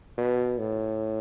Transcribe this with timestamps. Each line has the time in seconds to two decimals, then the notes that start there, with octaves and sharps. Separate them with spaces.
0.18 B2
0.58 A2